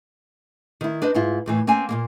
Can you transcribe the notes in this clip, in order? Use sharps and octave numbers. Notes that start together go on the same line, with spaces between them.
D#3 E4
D4 B4 C5 D#5
G#2 E4 F4
D#2 A2 E3
A#3 C4 C#4 G#5
A#2 E3 A#3